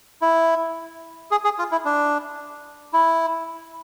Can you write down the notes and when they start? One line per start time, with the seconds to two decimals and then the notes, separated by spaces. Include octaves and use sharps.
0.22 E4
1.31 G#4
1.44 G#4
1.59 F4
1.72 E4
1.85 D4
2.93 E4